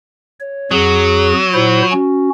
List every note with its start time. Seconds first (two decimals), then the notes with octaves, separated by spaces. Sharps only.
0.40 C#5
0.71 F2 F#3 G#4
1.54 A#2 E4 C5
1.92 C#4 F#4